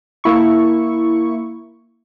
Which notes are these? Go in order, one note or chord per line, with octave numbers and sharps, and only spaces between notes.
A#3 E4 C#6